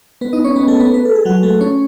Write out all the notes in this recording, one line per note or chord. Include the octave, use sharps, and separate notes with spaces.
B3 B4
D#4 D#5
C#4 C#5
B3 B4
A3 A4
B3 B4
B4
A4
G#4
F#3 F#4
A3 A4
C#4 C#5